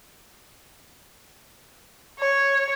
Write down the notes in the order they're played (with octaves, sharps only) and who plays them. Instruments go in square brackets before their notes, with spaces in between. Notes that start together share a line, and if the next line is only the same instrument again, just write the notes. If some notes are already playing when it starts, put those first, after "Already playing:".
[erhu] C#5